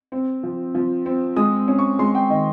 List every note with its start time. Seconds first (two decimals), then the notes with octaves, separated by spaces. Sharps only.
0.12 C4
0.43 F3
0.75 F3
1.06 C4
1.36 G#3 D#6
1.68 C#4
1.79 C#6
1.99 G#3 C6
2.15 G5
2.30 D#3 D#5